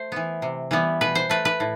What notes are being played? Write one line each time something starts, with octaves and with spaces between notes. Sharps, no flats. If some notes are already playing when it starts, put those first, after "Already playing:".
Already playing: A3 C5
E3 B3
C3
E3 G3 B3
B2 B4
C5
A3 B4
B4
A2